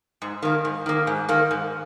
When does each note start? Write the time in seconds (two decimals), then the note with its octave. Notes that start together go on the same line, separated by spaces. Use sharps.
0.22 G#2
0.43 D#3 A#3
0.65 G#2
0.86 D#3 A#3
1.07 G#2
1.29 D#3 A#3
1.51 G#2